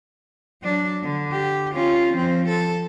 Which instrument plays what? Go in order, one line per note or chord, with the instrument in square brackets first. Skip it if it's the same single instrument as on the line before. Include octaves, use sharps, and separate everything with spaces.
[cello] F#3 D4
D3
G4
C#4 F4
F3 C4
A4